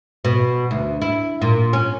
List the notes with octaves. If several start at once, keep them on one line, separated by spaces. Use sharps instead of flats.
B2
D2
E4
A#2
C#4